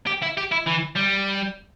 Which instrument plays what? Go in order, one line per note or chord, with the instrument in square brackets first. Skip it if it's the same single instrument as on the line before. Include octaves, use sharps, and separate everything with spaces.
[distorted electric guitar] G4
E4
G4
E4
E3
G3